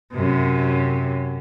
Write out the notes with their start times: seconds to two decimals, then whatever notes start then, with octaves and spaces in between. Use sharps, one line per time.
0.14 F#2 C3